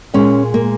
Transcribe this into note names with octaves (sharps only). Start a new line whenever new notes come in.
A#2 G#3 C#4
A#3